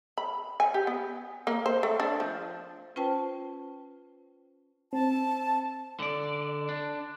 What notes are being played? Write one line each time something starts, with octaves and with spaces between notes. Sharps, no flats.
B5
G#5
G4
B3
A#3
C5
A3
D4
F3
C#4 F4 B4 C5 G5 A5
C4 A5
D3 D5
D4